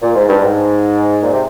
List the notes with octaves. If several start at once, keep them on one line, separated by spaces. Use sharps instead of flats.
A#2
G#2
G2
G#2
A#2
C3